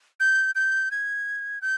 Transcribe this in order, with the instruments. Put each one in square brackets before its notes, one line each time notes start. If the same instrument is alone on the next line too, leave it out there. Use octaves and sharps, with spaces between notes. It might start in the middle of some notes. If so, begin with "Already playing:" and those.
[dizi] G6
G6
G#6
G6